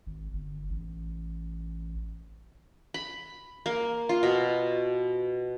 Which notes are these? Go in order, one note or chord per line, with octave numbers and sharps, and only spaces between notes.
G#1
G1
A1
B5
A#3
F4
B2